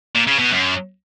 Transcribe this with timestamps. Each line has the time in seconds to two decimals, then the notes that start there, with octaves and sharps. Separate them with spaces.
0.15 A#2
0.27 C#3
0.39 B2
0.51 F#2